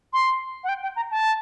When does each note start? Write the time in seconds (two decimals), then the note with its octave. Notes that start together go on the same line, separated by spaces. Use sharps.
0.13 C6
0.64 F#5
0.69 G5
0.82 G5
0.96 A#5
1.11 A5